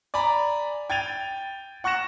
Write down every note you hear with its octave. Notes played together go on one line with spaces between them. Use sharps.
D5 G#5 A#5 B5
G5 G#6 A6 D#7 F7
F#5 C#6 F#6 A#6 E7